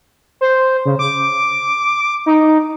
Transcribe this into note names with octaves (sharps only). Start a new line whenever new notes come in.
C5
C#3
D6
D#4